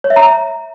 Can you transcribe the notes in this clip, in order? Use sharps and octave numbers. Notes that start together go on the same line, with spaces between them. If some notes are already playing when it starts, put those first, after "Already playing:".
C#5
E5
A#5